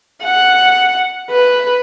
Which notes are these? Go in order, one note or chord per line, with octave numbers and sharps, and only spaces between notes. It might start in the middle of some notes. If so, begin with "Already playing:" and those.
F#5
B4